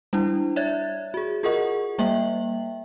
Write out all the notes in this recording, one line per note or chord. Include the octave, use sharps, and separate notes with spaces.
G3 D4 E4
C#5 D5 E5 F#6 G#6 A6
F#4 G#4
F4 G#4 A#4 D#5 F#5 C#6
G3 A#3 E5 G5 F#7